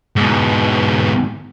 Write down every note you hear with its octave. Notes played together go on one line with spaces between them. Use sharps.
G#2 B2